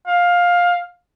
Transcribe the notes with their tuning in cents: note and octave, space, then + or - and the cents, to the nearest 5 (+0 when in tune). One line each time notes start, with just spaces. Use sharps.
F5 +15